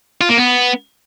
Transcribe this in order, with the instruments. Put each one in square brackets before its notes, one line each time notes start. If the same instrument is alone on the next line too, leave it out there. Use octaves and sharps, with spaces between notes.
[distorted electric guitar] F4
A#3
B3